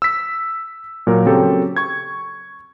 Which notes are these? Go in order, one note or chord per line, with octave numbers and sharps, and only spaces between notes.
E6 B6
A#2 F#3 A#4
C#3 F#3 C4 G4 A4
C#6 G#6